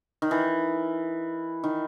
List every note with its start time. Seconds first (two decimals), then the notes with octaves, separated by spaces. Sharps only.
0.22 D#3
0.31 E3
1.64 D#3